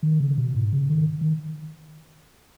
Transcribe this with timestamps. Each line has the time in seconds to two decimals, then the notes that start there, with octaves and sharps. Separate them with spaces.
0.03 D#3
0.20 C#3
0.38 B2
0.55 G#2
0.73 C#3
0.90 D#3
1.21 D#3